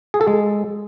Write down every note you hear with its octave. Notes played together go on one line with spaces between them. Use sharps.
G#4
A4
G#3